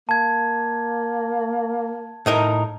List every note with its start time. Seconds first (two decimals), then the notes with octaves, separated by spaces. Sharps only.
0.09 A#3 A5 G#6
2.26 A2 D#4 A#4